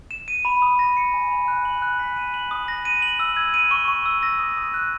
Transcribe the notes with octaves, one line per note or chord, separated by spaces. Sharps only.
E7
D#7
B5
D#6
A#6
C#7
G#5
B5
F#6
F#7
F#6
B6
D#7
F#7
D#6
A#6
D#7
F#7
E6
G#6
D#7
C#6
C#6
E6
A#6
D#6
D#6
F#6